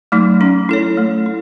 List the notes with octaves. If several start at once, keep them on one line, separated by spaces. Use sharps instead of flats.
F#3 A3 D#4
C#4
E4 A4 C#5
A3
E4